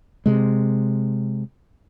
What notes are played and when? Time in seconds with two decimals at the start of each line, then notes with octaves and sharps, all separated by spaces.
0.26 C3 G#3